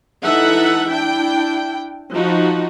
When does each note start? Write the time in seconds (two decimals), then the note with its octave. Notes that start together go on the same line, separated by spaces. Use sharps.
0.23 E3 D#4 A4 E5 F#5
0.90 D4 E4 G5
2.13 F3 D#4 F#4